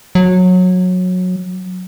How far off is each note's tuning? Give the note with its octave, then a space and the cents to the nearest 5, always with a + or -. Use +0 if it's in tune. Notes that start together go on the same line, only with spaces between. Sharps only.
F#3 -20